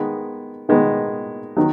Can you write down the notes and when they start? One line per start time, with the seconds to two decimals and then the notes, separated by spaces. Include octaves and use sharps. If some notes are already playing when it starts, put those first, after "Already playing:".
Already playing: D#3 G#3 B3
0.69 D#3 G#3 B3
1.56 D#3 F#3